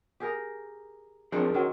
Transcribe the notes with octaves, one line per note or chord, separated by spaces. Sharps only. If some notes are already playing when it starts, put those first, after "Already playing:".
G4 G#4 A#4
F3 C4 D4 G#4 A#4 C5
D#3 F#3 C4 C#4